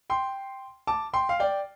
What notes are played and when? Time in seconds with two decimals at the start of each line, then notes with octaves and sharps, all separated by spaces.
0.10 G5 C6
0.87 A5 D6
1.13 G5 C6
1.29 F5
1.40 D5 G5